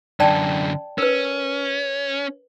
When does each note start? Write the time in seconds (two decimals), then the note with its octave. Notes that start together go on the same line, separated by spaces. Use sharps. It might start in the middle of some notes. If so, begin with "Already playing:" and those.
0.20 F#2 D3 D5 G5 A5
0.98 C#4 A#4 B4